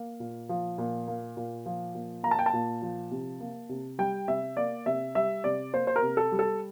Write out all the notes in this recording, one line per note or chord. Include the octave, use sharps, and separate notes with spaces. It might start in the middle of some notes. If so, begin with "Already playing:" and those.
Already playing: A#3
A#2
F3
A#2
A#3
A#2
F3
A#2
A#3 A#5
A5
G5
A5
A#2
F3
C3
A#3
C3
G3 G5
C3 E5
A#3 D5
C3 E5
G3 E5
C3 D5
A#3 C5
C5
A#4
C3
A4
G3
A4